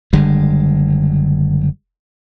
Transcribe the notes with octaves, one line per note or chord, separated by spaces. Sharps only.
F#1 D3 G3 G#3